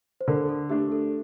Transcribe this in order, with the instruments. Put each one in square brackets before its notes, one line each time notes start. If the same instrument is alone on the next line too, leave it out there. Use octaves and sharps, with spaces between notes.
[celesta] C5
[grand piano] D3 [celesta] A#4
[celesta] A4
[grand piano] A3 D4 [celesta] G4
[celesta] A4